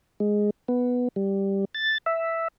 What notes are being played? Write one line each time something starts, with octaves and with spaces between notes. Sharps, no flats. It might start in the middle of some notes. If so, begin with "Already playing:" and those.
G#3
B3
G3
A6
E5